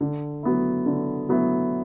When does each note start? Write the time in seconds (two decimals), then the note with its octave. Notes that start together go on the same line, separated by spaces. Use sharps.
0.01 D3
0.43 F#3 B3 E4
0.86 D3
1.29 F#3 B3 E4